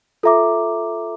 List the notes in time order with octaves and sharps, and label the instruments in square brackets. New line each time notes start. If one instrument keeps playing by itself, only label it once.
[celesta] F4 A4 E5 A#5 D6